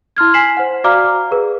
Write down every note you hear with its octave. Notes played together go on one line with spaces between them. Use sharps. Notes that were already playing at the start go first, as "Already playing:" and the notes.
E4 C6 F6 G#6
G#5 B6 C7 E7 F#7
C5 F#5
F#4 D5 F5 A#5 D6 F6
G#4 B4